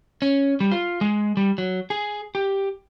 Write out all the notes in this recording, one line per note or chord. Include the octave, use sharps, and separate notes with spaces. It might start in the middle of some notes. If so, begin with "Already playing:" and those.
C#4
G3
F4
G#3
G3
F#3
G#4
G4